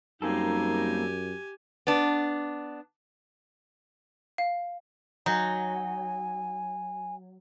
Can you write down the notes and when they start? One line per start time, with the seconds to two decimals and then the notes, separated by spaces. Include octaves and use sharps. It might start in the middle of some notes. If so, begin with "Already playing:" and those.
0.22 F#2 G3 A#3 C4 D#4 G4 A4 G#5
1.87 B3 D4
4.38 F5
5.26 F#3 D#4 G#5